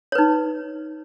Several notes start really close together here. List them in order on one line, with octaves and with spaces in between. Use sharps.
C#5 B4 D#4